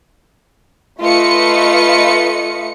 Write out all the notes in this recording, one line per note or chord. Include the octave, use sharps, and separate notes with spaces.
A3 F4 B4 D#5 C#7